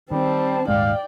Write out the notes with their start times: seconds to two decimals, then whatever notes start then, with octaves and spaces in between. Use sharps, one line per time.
0.11 D#3 G3 C4 A5
0.68 D#1 G#2 G#3 D5 F5 G5